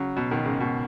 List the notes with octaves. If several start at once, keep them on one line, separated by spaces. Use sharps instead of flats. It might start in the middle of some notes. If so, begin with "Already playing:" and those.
Already playing: C#3 F#3
B2
B2 D#3
G#2 C#3
B2